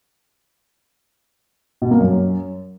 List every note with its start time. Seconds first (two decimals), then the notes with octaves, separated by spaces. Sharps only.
1.82 B2
1.91 A#3
2.01 F#2